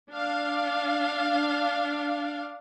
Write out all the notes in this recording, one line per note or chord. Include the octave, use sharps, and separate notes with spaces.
D4 F5